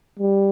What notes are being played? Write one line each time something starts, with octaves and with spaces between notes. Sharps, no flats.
G3